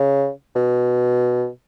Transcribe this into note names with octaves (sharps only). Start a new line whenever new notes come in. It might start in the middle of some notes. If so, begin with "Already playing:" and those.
Already playing: C#3
B2